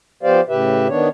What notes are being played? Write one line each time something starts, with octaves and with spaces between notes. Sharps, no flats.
F3 B3 G4 C5 D5 F5
A2 C#3 G4 B4 E5
D#3 B3 D4 C#5